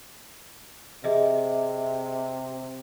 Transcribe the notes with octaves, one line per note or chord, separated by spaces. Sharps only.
C3 G#4 D#5 E5